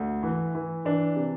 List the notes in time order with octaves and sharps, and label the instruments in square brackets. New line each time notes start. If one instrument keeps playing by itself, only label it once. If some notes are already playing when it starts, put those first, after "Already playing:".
Already playing: [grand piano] D2
E3
E3
E3 D4
C3